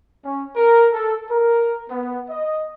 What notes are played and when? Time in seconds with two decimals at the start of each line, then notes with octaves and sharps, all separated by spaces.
0.24 C#4
0.56 A#4
0.92 A4
1.30 A#4
1.89 B3
2.29 D#5